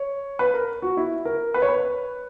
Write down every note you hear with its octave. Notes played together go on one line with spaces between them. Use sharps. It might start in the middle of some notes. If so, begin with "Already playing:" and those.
Already playing: C#5
B4
A#4
F#4
E4
A#4
B4
C#5
B4